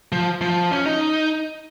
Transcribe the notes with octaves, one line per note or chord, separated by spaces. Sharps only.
F3
F3
C#4
D#4